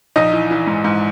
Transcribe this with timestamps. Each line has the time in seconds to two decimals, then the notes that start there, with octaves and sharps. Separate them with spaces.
0.16 A#1 D#4 D#5
0.33 E3
0.51 E3
0.67 G#2
0.84 G#2